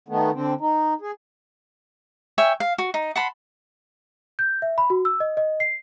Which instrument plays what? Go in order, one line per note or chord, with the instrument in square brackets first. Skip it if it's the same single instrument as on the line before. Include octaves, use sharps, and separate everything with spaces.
[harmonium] D#3 A3 B3
D3 C4
D#4
G#4
[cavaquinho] C#5 E5 G5 G#5
F5
F#4
D#4
F#5 A5 B5 C6
[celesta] G6
E5
B5
F#4
E6
D#5
D#5
C7